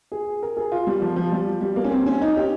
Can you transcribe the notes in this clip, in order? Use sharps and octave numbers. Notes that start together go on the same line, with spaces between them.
G#4
A#4
G#4
F4
G3
F3
F3
G3
G3
A#3
C#4
C4
C#4
D#4
G4